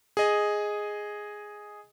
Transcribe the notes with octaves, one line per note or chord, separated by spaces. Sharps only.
G#4 D#5